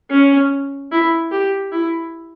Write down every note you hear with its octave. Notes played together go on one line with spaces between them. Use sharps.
C#4
E4
G4
E4